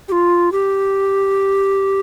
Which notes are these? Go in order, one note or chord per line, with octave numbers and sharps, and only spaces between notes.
G4
F4
G4